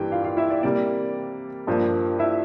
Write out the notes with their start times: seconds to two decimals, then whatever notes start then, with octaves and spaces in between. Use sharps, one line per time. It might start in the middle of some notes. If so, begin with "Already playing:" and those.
Already playing: G2 E3 A#3 G4 A#4 G5
0.12 F4 F5
0.24 F4 F5
0.37 E4 E5
0.50 D5
0.63 C3 G3 A#3 D5
1.67 G2 F3 A#3
2.19 E4 E5